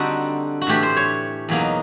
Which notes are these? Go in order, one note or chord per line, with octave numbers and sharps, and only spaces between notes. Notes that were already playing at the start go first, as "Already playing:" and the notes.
Already playing: D3 G3 C4 D#4 F#4 A4
F#4
A2 E3 A3 D4 G4
C5
C#5
E2 B2 F#3 A#3 D#4